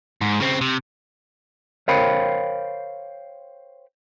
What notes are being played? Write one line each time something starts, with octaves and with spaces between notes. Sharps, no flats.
G#2
C#3 C4
C3
A#4 C5 C#5 F5 G5 B5